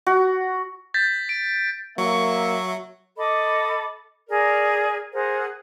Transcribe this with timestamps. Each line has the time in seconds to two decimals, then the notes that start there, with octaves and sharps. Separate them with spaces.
0.06 F#4
0.94 G6 A6 B6
1.29 D7
1.98 F#3 A#3 E5 C#6
3.17 A4 D#5 B5 D6
4.28 G#4 A#4 D5
5.12 G#4 A#4 C5 F#5